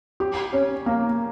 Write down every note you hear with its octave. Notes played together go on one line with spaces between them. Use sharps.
G4
C#4
A#3